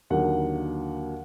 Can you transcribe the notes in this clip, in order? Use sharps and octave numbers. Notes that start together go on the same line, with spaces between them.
D#2 D3 F#3 A#3 F#5